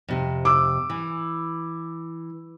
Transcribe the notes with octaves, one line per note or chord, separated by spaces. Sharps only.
F2 C3
D6 E6
E3